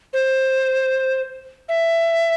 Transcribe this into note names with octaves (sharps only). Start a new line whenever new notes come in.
C5
E5